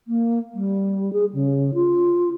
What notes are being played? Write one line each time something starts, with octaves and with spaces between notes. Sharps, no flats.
A#3
G3
G#4
C#3
F4